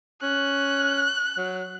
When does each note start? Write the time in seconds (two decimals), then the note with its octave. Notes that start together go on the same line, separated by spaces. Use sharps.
0.22 C#4 F#6
1.38 F#3